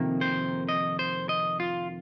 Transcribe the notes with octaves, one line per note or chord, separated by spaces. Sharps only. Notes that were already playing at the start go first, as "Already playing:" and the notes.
Already playing: F2 C3 D#3 A#3
C5
D#5
C5
D#5
F4